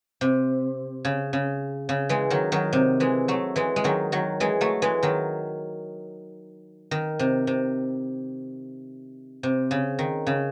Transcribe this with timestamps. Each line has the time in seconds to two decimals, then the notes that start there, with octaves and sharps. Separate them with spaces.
0.21 C3
1.05 C#3
1.33 C#3
1.89 C#3
2.09 E3 G#3
2.30 D#3 F#3
2.52 D#3 F#3
2.73 C3
3.00 E3 G#3
3.28 F#3 A3
3.56 E3 G#3
3.76 G#3
3.84 D#3 F#3
4.12 D#3 F#3
4.40 E3 G#3
4.61 F#3 A3
4.82 E3 G#3
5.03 D#3 F#3
6.91 D#3
7.19 C3
7.47 C3
9.43 C3
9.71 C#3
9.99 D#3
10.27 C#3